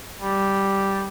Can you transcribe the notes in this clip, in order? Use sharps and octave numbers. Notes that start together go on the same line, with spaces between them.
G3